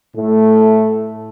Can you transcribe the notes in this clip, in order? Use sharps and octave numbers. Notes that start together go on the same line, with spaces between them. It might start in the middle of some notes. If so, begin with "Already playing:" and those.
A2 A3